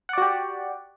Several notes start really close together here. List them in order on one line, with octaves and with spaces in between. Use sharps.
F#5 D5 F#4 G4